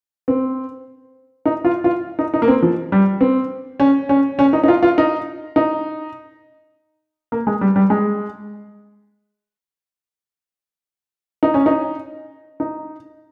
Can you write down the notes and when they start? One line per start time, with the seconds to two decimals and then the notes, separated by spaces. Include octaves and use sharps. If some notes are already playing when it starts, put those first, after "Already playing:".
0.28 C4
1.46 D#4
1.65 F4
1.84 F4
2.19 D#4
2.34 D#4
2.42 A#3
2.48 C4
2.62 F3
2.92 G3
3.21 C4
3.80 C#4
4.09 C#4
4.39 C#4
4.53 D#4
4.64 D#4
4.68 F4
4.83 F4
4.98 D#4
5.56 D#4
7.32 A#3
7.47 G#3
7.61 G3
7.76 G3
7.90 G#3
11.43 D#4
11.54 C#4
11.66 D#4
12.60 D#4